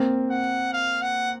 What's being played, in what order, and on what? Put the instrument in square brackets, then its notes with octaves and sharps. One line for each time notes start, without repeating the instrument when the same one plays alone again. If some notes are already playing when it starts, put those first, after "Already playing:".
Already playing: [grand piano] A#3 C4
[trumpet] F#5
F5
F#5